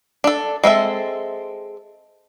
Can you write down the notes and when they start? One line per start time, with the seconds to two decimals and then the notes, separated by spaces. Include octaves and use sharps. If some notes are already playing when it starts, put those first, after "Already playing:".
0.24 D4 A4
0.64 G#3 C4 A4 E5